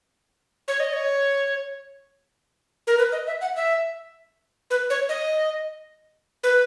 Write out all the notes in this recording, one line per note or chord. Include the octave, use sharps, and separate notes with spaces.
C#5
D#5
C#5
A#4
B4
D#5
E5
F#5
E5
B4
C#5
D#5
B4